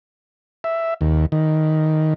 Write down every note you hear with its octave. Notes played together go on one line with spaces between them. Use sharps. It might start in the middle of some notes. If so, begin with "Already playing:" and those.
E5
D#2
D#3